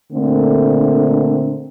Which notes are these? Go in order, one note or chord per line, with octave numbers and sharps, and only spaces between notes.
A#2 D3 A3 C4